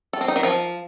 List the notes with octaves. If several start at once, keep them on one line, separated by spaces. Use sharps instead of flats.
A4
C4
D#4
D#3
F3